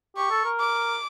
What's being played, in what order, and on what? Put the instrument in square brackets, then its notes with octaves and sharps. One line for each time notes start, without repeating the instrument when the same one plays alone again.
[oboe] G4 [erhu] C#6
[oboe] A4
A#4
[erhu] D6